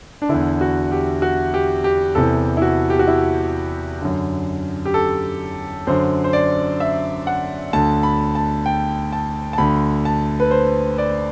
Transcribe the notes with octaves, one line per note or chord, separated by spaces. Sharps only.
D4
E2 D3 E4
F#4
G4
F#4
G4
G4
E2 C3 E3 A4
E4
F#4
G4
F#4
E4
F#2 D3
G4
A4
F#2 D3 C5
C5
D5
E5
F#5
D2 D3 A5
B5
A5
G5
A5
A5
D2 D3 B5
A5
B4
C5
D5